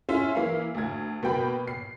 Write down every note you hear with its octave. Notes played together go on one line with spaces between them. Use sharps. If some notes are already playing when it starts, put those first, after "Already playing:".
C#4 E4 F4 E5
E3 A#3 E4 F5
D2 G#6
B2 A#3 G5 B5
C7